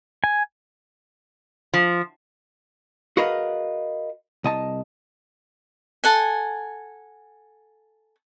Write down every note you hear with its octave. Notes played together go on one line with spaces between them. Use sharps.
G#5
F3
F#4 G#4 A#4 B4 D#5 F5
C2 D#5 A5
A4 F#5 G#5